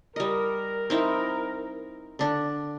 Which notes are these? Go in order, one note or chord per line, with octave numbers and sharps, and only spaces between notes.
G3 A#4 D#5
C4 D#4 E4
D3 D4